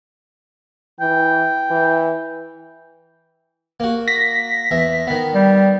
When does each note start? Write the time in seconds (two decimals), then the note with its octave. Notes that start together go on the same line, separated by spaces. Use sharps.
1.00 E3 G5
1.71 E3
3.80 A#3 F#4
4.08 A#6 B6
4.71 E2 E5
5.07 D#3 B3
5.34 G3